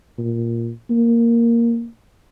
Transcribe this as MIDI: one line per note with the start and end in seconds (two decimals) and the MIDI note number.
0.19 0.70 46
0.90 1.87 58